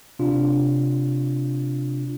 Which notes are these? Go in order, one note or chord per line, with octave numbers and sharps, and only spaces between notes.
C3 D4 F4